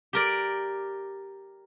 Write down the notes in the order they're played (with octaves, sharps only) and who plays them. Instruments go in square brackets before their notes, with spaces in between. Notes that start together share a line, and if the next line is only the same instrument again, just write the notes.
[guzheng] G4 A#4 D5